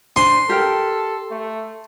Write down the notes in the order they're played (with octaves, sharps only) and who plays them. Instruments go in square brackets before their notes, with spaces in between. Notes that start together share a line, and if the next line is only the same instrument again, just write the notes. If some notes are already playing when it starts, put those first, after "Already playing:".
[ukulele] D4 C5 G#5 [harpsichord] C6
[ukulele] G4 A#4 G5 [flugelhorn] A4
[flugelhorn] A3